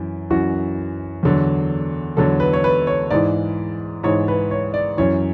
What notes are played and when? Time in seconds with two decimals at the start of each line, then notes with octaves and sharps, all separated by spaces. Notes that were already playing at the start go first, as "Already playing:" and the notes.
Already playing: F#2 E3
0.30 F#2 E3 F#4
1.23 E2 D3 F#3
2.17 E2 D3 F#3 A4
2.40 B4
2.53 C#5
2.64 B4
2.87 C#5
3.10 G#2 E3 D5
4.03 G#2 E3 C#5
4.28 B4
4.51 C#5
4.74 D5
4.97 F#2 E3 C#5